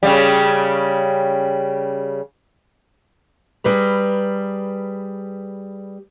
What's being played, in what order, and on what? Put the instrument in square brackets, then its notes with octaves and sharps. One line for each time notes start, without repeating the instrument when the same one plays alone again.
[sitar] C#3 G3
[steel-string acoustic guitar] G3 G#4 B4 A#5